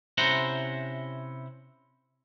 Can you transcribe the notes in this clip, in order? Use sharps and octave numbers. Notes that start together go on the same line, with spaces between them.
C3 C#4 E4 C5 F#5 A#5